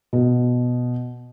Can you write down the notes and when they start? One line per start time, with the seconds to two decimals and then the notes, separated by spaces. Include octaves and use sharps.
0.13 B2